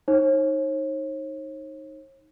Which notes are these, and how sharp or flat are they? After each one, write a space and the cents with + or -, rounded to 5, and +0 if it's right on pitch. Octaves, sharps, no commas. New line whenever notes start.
D#4 +0 C#5 -45